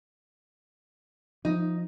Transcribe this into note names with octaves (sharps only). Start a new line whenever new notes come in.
F3 D#4